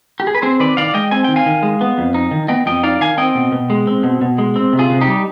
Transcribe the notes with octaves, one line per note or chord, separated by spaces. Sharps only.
G4
G#4
B4
C4 G#4 C5
D#3 B4 D5
D#3 D5 F5
G#3 D#5 G5
C4 G#5
D#3 G5
F5 G#5
D#3
G#3
B3
F2
D#4
D#3
B3 D#5 G5
F2 D#5 G5
D#4 D5 F5
D#3 F5 G#5
C4 D#5 G5
B2
B2
G#3
C4
B2
B2
G#3
C4
C3
F4 G#4
C3
D#4 G4
G3